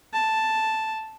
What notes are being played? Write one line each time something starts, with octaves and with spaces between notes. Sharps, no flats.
A5